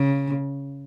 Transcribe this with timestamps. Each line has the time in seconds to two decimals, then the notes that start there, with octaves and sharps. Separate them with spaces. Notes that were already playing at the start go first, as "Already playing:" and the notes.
Already playing: C#3